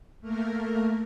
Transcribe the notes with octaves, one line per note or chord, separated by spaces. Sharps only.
A3 A#3 A#4